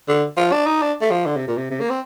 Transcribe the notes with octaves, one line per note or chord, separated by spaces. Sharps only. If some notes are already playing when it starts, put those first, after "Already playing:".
D3
F3
D4
D#4
D4
A3
F3
D3
C3
A#2
C3
C3
A#3
C4